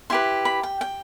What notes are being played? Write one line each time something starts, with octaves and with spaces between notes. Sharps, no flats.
E4 G4 B4 C6
B5
G5
G5